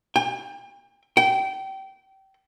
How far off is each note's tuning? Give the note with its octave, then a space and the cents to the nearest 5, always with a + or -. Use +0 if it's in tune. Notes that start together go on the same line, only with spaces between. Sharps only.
G5 +40
G5 -25